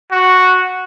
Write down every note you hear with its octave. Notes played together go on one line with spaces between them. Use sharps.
F#4